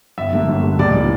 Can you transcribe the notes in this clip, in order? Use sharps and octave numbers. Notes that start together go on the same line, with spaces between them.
G1 E5
G2 D3 A#3
G1
G2 D3 A#3
C#2 D5
C#3 E3 G3 A#3